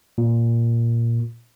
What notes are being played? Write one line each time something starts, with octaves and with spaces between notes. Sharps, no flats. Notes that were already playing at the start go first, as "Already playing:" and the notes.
A#2